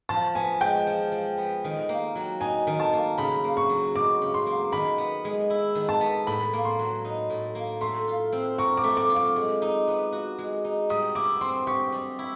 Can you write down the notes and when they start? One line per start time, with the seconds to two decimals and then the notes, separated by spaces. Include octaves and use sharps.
0.09 F3 A5
0.35 B3 G#5
0.60 G#3 G5
0.87 F3
1.12 F3
1.38 B3
1.64 D#3
1.89 A#3
2.15 F#3
2.41 D#4 G#5
2.67 D#3
2.80 A5
2.93 A#3
3.18 C#3 B5
3.44 A#3
3.57 C#6
3.69 F#3
3.95 D#4 D6
4.22 C#3
4.34 C6
4.46 A#3
4.72 D#3 B5
4.98 B3
5.25 G#3
5.50 E4
5.75 D#3
5.89 A5
6.01 B3
6.27 A2 B5
6.53 A#3
6.65 C6
6.79 F#3
7.05 D#4
7.30 A2
7.55 A#3
7.81 A3 C6
8.08 F4
8.33 C4
8.58 A#4 C#6
8.77 D6
8.84 A3
8.97 D6
9.09 F4
9.16 D6
9.36 G#3
9.62 D#4
9.87 B3
10.12 F#4
10.39 G#3
10.65 D#4
10.90 G3 D#6
11.15 E4 D6
11.41 C4 C6
11.67 G4 C#6
11.92 G3
12.19 E4